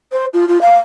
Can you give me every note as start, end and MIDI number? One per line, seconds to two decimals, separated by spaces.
0.12 0.25 72
0.33 0.45 65
0.48 0.60 65
0.61 0.76 77